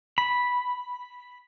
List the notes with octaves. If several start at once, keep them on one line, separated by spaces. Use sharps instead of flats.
B5